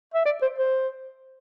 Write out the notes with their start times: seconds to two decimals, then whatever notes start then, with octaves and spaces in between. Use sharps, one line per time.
0.14 E5
0.26 D5
0.42 C5
0.58 C5